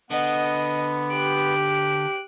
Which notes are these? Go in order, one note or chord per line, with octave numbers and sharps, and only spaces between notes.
D3 B3 D#5
G4 F#6 D7